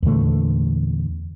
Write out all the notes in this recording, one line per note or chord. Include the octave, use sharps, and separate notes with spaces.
E2 A#2 D3 A3